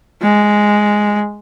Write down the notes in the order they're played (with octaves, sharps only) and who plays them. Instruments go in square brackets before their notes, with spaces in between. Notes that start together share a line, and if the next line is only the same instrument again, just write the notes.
[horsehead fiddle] G#3